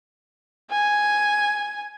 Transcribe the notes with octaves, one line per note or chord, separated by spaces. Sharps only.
G#5